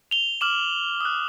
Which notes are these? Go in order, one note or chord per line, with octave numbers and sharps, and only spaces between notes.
F7 G7
D6 F6 E7 F#7
D#6 F#6